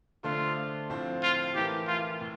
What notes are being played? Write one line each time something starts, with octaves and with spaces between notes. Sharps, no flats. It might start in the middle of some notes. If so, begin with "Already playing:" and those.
D3 A3 D4 F4 A4 C5
A2 F3 C4 F4 C5
F4
E3 A3 E4 G4 A#4
F4
A2